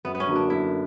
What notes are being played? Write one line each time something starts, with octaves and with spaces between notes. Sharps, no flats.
F#2 B3
B3
C#4
D3 F#3 A#3
D4
F#2 E4